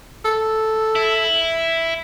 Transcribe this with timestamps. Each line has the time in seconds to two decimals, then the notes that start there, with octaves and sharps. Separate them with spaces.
0.25 A4
0.96 E4